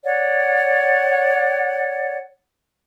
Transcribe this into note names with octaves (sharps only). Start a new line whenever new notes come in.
C#5 D5 F#5